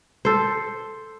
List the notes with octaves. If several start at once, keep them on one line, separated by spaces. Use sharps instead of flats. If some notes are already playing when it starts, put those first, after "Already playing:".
A4 C5